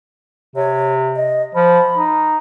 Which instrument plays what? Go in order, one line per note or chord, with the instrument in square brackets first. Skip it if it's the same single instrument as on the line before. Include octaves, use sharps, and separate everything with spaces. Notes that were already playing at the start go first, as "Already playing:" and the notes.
[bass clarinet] C3 [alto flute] C#5
[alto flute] D#5
[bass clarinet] F3 [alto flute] B5
[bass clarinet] D#4